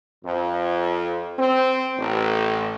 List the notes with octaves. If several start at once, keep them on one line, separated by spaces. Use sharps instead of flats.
F2
C4
A1